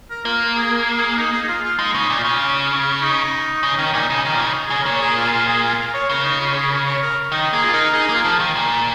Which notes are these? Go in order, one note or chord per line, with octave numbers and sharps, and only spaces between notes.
A#4
A#3 F4
G#4
G#4
D#4
G#4
D#4
F4
F4
G#3 D#4
C#3 D#4
A#2
F4
C#3
C#4
D#4
C#3 D#4
D#3 C#4
A#2 D#4
C#3 D#4
D#3 C#4
A#2 C#3 F4
D#4
C#3 G#4
A#4
A#2 C#5
G#4
F4
F4
G#4
F4
A#4
C#5
C#3 A#4
D#4
F4
G#4
A#4
C#5
A#4
D#3 D#4
A#3 G#4
F4
D#4 A#4
D#4 G#4
A#3
F4
F3
D#3
A#2